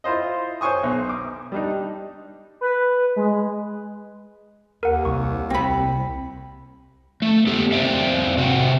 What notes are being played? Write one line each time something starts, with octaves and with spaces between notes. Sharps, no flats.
E4 F4 C5 D#5
C5 C#5 G#5 C#6 D#6
B1
D6
G3 D4 D#4
B4
G#3
D#2 A#4 F#5
C2 C#6
C2 C4 B5
A3
B3 G4 A4
C4 C5 D5 E5 F5
C3 F#4